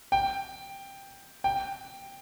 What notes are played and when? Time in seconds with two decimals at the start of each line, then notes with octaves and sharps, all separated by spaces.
0.12 G5
1.44 G5